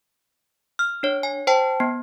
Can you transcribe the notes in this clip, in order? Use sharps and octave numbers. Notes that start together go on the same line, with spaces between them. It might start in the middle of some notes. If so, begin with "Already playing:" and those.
F6
D4 C#5
G#5
C5 G5 A5
B3